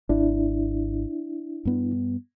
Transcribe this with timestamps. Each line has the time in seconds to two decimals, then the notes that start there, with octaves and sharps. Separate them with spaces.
0.09 G#1 D4 E4
1.65 G2 B3